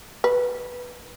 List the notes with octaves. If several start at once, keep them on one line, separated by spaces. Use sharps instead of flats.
B4